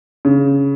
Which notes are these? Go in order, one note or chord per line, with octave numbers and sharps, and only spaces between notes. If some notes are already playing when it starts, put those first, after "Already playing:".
C#3